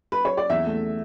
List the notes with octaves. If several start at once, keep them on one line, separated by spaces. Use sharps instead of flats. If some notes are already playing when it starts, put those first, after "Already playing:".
B4
C#5
D5
E2 E5
A3